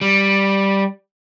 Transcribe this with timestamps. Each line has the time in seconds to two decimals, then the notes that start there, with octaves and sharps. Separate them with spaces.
0.01 G3